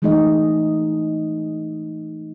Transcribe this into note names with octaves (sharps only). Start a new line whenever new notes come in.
E3 G#3 A3 D#4 G#4 D#5